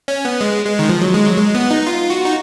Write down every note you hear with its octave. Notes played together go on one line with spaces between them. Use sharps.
C#4
B3
G#3
G#3
D#3
F3
F#3
G#3
F#3
G#3
B3
D#4
F4
F#4
D#4